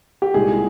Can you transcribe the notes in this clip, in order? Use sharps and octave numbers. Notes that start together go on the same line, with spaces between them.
G4
C2 A#2 G#3 D#4 G#4